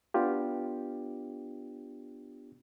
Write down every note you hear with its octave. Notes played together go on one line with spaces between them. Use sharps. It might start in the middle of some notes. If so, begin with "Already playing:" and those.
B3 D4 F4 G4